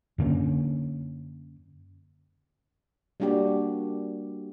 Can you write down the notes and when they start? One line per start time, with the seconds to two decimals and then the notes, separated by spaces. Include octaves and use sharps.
0.18 F#2 D3 A#3 C#4
3.20 G3 A#3 D4 F#4 G4